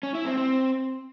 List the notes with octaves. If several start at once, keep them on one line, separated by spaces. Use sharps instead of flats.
C#4
E4
C4
C4